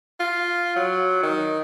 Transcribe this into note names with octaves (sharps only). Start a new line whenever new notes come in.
F4
F#3
D#3